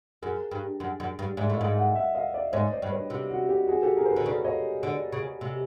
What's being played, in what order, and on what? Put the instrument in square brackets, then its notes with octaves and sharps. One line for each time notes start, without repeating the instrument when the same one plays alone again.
[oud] F#2 [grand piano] G#4 A#4
[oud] G2
F#2
F#2
G2
[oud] G#2 [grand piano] D5 E5
[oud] A2
[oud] G#2 [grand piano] D#5 F5
[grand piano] E5 F#5
E5 F#5
D#5 F5
D5 E5
[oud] G#2 [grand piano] C#5 D#5
[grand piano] C5 D5
[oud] G2
[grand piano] B4 C#5
[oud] C3 [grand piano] G4
[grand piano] F#4
G4
F#4 G#4
G4 A4
G#4 A#4
C5
[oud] D3 [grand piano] A4 B4
[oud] C#3 [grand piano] A4 B4
[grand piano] C#5 D#5
[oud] D3
C#3
C3